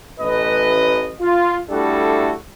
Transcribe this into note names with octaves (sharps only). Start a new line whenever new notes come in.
A1 B4 D#5
F4
G3 A3 D4 E4 F#4 A4